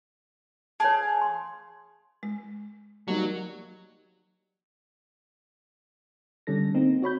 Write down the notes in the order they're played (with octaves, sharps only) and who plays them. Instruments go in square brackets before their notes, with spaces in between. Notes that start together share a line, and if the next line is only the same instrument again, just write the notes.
[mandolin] G#4 F5 [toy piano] C#5 A5
[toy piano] C6
[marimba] G#3
[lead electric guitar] F#3 [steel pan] G3 A#3 D#4
[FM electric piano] D3 G3 C#4 A4 A#6
A#3 C4 D#4
F#4 C#5 B5 G6